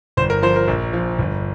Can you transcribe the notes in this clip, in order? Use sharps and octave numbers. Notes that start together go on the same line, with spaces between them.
G1 C5
A#4
F3 C5
A#4
A#1
F3
G1